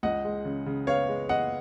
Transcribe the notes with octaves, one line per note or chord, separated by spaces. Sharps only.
C#2 D#5 F#5
G#3
C#3
C#3
B3 C#5 F5
G#3
B3 D#5 F#5